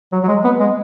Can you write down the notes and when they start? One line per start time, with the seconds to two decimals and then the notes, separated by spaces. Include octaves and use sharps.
0.12 F#3
0.23 F#3
0.28 G#3
0.44 B3
0.60 G#3